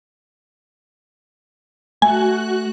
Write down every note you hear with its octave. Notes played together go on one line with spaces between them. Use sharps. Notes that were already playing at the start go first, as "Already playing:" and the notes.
A3 F#4 G#5 F#6